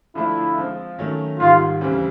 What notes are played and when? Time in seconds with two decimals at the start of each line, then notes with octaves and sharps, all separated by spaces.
0.15 D3 F3 A3 D4 E4 F4
0.57 F3 G#3 C4 F4
0.98 D#3 F#3 A3 C#4
1.39 G#2 D#3 G3 F4
1.81 D2 C#3 E3 G3 C4